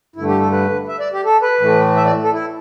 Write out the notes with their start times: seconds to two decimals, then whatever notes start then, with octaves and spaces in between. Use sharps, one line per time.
0.16 G2 D3 A3 E4
0.29 G4
0.40 A4
0.52 B4
0.88 E5
1.00 D5
1.13 G4
1.24 A4
1.42 B4
1.60 A2 E3 A3
1.96 E5
2.06 D5
2.24 A4
2.33 E4